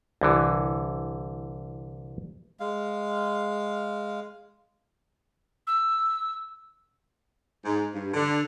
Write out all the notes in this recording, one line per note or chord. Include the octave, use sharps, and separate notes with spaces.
C2 D3 E3
G#3 F5
E6
G#2
G2
D3